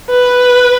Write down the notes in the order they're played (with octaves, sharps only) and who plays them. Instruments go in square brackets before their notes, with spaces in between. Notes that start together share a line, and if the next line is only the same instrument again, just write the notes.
[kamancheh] B4